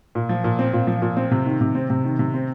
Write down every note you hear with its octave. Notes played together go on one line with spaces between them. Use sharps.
A#2
F3
A#2
C4
A#2
F3
A#2
C4
C3
D#3
C3
C4
C3
D#3
C3
C4